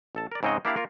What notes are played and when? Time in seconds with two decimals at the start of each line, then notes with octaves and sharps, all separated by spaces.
0.15 A1 A4 A5
0.32 A#4 D5
0.43 G#2 C#3 C4 C#5 D#5 F#5
0.65 A#3 D4 E4 G4 D5 F5
0.76 A#3 F4 A#4